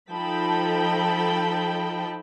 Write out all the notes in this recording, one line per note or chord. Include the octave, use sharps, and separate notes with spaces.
F3 D#4 A4 G5 A5 B5